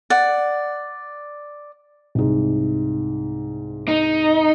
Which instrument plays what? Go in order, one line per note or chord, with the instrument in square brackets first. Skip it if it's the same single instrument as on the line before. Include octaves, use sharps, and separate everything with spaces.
[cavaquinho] D5 F#5
[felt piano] C2 G#2
[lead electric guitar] D#4